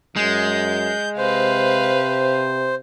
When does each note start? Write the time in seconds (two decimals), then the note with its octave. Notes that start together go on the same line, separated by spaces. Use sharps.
0.16 F#2 G#3 G6
1.18 C3 B4 C5 F5